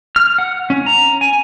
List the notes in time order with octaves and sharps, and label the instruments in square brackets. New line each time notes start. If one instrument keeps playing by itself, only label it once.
[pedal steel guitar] F6
F#5
C#4
A#5
G#5